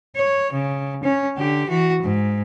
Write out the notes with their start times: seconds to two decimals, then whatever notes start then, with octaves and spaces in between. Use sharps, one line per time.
0.16 C#5
0.52 C#3
1.04 C#4
1.37 D3 G4
1.68 E3 F#4
2.02 G#2